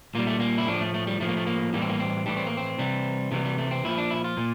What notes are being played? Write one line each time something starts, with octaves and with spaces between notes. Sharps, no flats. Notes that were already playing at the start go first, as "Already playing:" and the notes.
A#2 G3 A#3
A3
A#3
E4
A2 F3 D4
A3
A3
G3
A2 F3 A3
A#3
A3
A#3
A2 E3 G3 A#3
C4
A#3
C4
A2 E3 G3 D4
C4
A#3
C4
C3 E3 G3
C3 E3 G3 A3
G3
A3
C4
A#2 F3 E4
D4
E4
F4
A#2